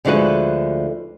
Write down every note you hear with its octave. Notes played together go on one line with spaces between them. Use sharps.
D2 D3 F3 G#3 F#4 B4